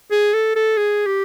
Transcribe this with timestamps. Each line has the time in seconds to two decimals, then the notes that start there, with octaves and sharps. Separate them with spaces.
0.11 G#4
0.34 A4
0.56 A4
0.77 G#4
1.06 G4